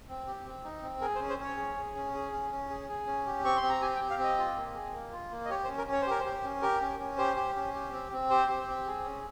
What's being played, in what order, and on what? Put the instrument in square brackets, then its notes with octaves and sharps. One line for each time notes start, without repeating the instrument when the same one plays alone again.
[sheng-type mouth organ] C4
G4
C4
D#4
C4
G#4 A#4
C5
C#4
C5
C#4 C#5
G#4
G#4
C#4
G#4
C#4
C#4
G#4
G#4
C#4
G4
C4 C#6
C6
C4
A#5
G4 G#5
G5
G4
F5
C4
D#5
F4
A#3
G#4
A#3
F4
A#3
D#5
G4 C#5
C5
C#4
A#4
C#4
C#5
C5
G4 A#4
C5
G4
C#4
G4 A#4
C#4
C#4
G4 C5
G4
C#4
G4
C4
C4
G4 C5
G4
C4
G#4
C#4